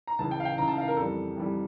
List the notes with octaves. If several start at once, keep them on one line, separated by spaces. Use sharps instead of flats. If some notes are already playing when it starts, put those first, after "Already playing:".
A#5
C#2 C#3 E3 A5
G5
F5
G5
C#2 C#3 E3 A#5
A5
F5
A#4
F2 E3 G3 A4
F2 E3 G3